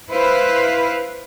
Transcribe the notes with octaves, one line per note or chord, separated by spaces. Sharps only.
E4 B4 C5 F5